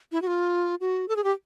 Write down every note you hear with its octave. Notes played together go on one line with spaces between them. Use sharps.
E4
F#4
F4
F#4
A4
G#4
G4